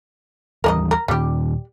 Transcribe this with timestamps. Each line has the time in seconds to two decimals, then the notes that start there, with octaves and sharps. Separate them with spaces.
0.64 D#2 E3 G3 A#4 D5 D#5
0.91 A#4
1.08 D#2 A#2 D#3 G3 G4